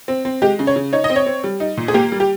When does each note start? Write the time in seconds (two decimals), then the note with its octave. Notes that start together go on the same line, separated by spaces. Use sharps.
0.08 C4
0.25 C4
0.42 G#3 G4
0.59 C#3
0.67 C#5
0.76 C#3
0.93 D#4 C#5
1.04 D#5
1.10 C4
1.16 C#5
1.26 C4
1.44 G3
1.60 D#4
1.77 A#2
1.88 G#4
1.94 A#3 G4
2.12 G3
2.20 G4